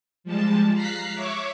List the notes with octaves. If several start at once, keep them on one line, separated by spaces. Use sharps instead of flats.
F3 G3 G#3 A5
F5 A#5 F#6 B6 C7
C#5 E5 C#6 D6